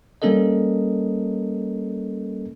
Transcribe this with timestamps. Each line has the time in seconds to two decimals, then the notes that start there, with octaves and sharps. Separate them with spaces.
0.22 G3 A#3 C#4 A4 A#4 D#5